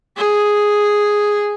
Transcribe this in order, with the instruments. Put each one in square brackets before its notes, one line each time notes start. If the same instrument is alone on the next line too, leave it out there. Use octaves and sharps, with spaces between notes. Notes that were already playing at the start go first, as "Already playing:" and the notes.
[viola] G#4